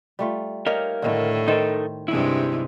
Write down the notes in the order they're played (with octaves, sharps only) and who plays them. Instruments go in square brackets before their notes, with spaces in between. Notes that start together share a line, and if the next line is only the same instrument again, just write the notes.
[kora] G3 A3 F4
[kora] D#4 G4 [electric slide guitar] A#4 C#5 F5
[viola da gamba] A2 [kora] D3 D#3 E4
[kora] D#3 C5 [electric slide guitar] D#4 A4 A#4
[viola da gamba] G2 C3 G#3 [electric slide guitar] E4